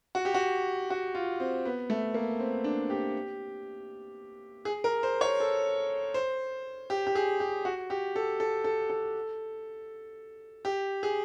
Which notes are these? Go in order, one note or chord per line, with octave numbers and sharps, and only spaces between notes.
F#4
G4
F#4
F#4
F4
C4
B3
A3
A#3
C4
D4
G4
G#4
A#4
C5
C#5
A4
C5
G4
G4
G#4
G4
F#4
G4
A4
A4
A4
A4
G4
G#4